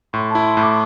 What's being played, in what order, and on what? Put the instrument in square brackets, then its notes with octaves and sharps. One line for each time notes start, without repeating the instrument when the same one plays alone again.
[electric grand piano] A2 [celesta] C6
[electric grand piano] E4 [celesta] A5
[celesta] C6
[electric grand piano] A2
[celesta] D6